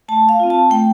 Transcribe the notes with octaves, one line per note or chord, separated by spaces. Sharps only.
A3 A5
F5
C4 F4
A5
A3 G5